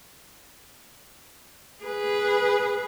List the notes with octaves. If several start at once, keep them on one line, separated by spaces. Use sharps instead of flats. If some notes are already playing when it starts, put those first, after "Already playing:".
G#4 B4